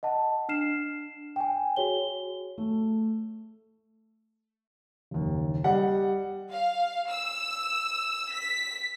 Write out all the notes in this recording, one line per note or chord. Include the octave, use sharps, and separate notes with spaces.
D#5 F#5 A5
D4 F6 C7 E7
G5 G#5
F#4 G#4 C#5 G7
A3
F#1 D#2
G3 D#5 F#5
F5
E6
B6